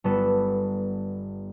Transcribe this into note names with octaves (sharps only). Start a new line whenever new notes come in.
G1 G3 B3 A4 B4 E6